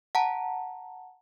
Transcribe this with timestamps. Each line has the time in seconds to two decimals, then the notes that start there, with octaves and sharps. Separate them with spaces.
0.15 F#5 A5 A#5